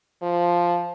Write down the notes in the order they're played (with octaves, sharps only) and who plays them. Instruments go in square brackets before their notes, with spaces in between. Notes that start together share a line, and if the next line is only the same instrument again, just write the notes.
[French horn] F3